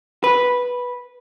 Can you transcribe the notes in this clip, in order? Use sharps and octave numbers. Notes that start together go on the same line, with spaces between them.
B4